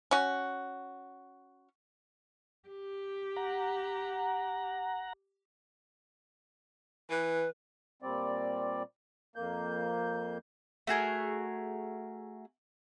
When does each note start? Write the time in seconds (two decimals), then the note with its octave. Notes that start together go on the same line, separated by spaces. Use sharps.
0.11 C#4 F#4
2.68 G4
3.36 F#5 A#5
7.10 E3 B4
8.02 A#2 G3 C4 D5
9.36 F2 A#3 G6
10.87 A3 F#4 G#4 A#4